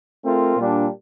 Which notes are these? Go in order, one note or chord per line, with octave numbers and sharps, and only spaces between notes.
A3 C4 F4 A#4
A#2 G3 D4